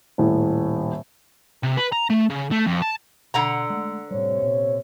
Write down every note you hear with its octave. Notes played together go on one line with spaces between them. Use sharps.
D#1 A2
C3
B4
A#5
A3
C#3
A3
F2
A5
B2 D3 F#5 A#5
G#3 A3
A2 C3 G3 C5 C#5
A#2 B3